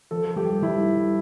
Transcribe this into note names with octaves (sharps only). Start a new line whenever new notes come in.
F3 A4
A4
G2 G4
G2 E4